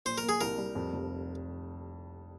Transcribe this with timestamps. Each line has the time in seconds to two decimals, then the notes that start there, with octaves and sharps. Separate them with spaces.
0.05 A#2 C5
0.18 A#4
0.23 A#3
0.29 G#4
0.41 C2 A#4
0.58 G3
0.75 F2
0.93 F1